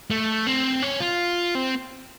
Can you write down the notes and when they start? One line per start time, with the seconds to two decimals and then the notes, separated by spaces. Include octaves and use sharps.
0.10 A3
0.47 C4
0.82 C#4
1.00 F4
1.55 C4